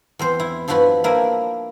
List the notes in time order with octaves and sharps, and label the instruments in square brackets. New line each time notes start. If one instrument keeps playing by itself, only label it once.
[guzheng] E2 C4 C5
E4
G2 F3 E4 F#4 B4 B5
F3 A#3 D4 E4 A#4 E5